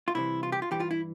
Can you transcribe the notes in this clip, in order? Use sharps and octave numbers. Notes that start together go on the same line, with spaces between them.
F4
C2 C3 E3 E4
F4
G4
F4
G2 E3 G4
F4
E4